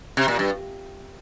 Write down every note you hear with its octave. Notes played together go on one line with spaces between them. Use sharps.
C3
A#2
G2